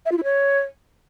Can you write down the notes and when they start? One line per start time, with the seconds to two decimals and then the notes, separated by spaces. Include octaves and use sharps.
0.06 E5
0.12 F4
0.18 E4
0.24 C#5